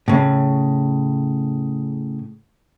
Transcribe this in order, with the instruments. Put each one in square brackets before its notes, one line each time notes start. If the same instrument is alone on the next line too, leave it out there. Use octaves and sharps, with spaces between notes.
[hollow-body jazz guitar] A2 C#3